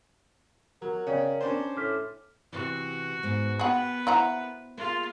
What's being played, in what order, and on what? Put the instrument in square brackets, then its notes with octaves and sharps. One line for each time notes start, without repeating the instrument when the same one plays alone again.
[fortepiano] F#3 [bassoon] A#4
[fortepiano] C#3 [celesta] C#5 D5 G5
[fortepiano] C#4 D4 C5
[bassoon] A2 [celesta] D6 F6 B6
[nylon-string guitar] C3 E3 [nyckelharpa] F#4
[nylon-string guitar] G#2 B3
[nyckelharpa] B3 B4 [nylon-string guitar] F#4 G5 [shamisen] G#4 F#5
[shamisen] E4 F#5 A#5 [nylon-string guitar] C5
[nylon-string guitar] A#3 G#4 [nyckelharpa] F4